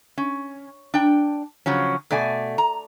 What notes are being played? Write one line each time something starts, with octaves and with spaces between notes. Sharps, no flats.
C#4
D4 G5
C#3 F3 F#3 C#4
B2 A3 D5 G#5
A#5